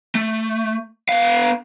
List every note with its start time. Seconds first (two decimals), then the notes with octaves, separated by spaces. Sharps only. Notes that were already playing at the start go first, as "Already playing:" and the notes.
0.15 A3
1.09 B3 F5